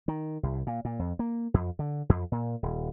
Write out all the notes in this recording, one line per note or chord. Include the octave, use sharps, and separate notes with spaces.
D#3
C2
A#2
A#2
F2
A#3
F2
D3
F2
A#2
D#1